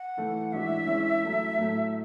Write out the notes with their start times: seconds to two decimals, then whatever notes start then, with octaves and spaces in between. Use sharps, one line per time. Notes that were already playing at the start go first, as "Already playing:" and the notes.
Already playing: F#5
0.17 E3 A3 E4
0.53 E3 G#3 D4 F#4 E5
0.87 E3 G#3 C#4
1.22 F#3 A3 E4
1.57 A2 F#3 A3